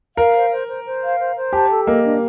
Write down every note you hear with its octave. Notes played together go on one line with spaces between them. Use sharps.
A#4 F5
C5
C5
C5
C5
F5
C5
C5
G4 A5
A4
A#3 D#5
D4